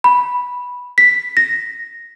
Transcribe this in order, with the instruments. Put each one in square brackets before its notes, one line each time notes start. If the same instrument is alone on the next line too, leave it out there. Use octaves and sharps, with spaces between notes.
[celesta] B5
B6
A#6